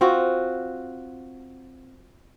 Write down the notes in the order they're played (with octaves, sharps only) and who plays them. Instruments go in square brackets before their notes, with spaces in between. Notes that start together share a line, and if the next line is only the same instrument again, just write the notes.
[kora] C4 F4 F#4